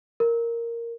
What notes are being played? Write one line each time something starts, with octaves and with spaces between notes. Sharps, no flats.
A#4